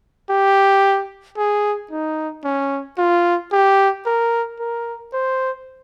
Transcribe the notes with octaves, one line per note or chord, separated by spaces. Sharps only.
G4
G#4
D#4
C#4
F4
G4
A#4
A#4
C5